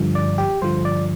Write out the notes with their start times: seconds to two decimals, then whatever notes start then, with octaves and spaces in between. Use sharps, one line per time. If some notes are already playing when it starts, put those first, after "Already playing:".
Already playing: G2 D3 F3
0.15 D5
0.38 G4
0.62 G2 D3 F3 C5
0.85 D5